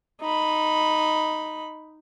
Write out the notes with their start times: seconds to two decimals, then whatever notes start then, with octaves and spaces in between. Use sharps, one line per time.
0.21 D#4 B5